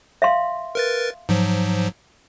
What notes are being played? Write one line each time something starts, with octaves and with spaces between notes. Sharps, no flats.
E5 F5 C6
A#4 B4 A6
G#2 F3 F#3